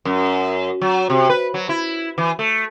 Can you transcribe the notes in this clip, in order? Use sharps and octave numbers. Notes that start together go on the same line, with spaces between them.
F#2
F#3
C3
B4
F#3
E4
E3
A3